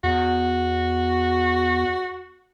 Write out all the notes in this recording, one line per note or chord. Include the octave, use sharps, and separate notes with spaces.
E2 F#4